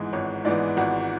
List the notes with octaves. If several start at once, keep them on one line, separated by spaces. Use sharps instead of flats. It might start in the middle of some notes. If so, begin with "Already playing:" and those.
Already playing: G#1 G#2 E3 G#3 B3
G#1 C#5
G#2 E3 G#3 B3 D5
G#1 F#4